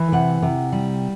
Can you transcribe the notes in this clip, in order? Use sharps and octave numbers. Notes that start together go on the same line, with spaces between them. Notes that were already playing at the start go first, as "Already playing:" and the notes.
Already playing: E3
C3 F#5
C3
G3